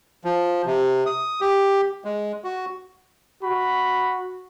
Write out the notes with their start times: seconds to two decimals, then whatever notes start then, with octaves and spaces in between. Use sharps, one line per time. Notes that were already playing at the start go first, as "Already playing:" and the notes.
0.25 F3
0.66 C3
1.06 D#6
1.41 G4
2.05 G#3
2.44 F#4
3.43 F#4 B5